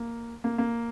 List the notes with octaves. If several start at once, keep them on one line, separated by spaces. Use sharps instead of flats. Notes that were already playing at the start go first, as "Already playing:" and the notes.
Already playing: A#3
A#3
A#3